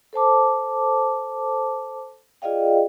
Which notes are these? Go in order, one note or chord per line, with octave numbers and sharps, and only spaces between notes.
A4 C5 A5 D6
F4 G#4 D5 D#5 F5 G5